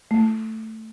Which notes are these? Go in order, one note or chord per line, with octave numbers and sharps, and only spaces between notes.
A3